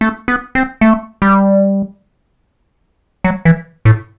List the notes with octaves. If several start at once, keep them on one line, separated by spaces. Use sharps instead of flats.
A3
B3
C4
A3
G3
F#3
E3
A2